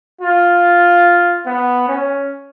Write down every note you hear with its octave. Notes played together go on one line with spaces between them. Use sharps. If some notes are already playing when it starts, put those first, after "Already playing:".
F4
B3
C#4